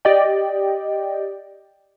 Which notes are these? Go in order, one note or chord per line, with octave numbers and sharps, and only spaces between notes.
G4 D5 D#5 G5